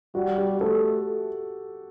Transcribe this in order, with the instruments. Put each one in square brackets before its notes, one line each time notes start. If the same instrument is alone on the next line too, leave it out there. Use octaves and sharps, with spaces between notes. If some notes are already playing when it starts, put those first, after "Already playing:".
[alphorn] G3 [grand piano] F#4
[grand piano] G4
[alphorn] A3 [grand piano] A4